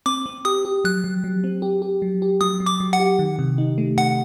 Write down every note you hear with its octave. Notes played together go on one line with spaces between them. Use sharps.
C4 D6
C4
G4 D#6
G4
F#3 F#6
F#3
F#3
C4
G4
G4
F#3
G4
F#3 D#6
F#3
D6
F#3
F#5
G4
D#3
C3
D#4
A3
C3 F#5